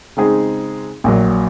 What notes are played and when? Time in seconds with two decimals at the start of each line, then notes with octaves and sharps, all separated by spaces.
0.17 C#3 G#3 C4 D#4 G#4
1.04 A#1 A#2 F#3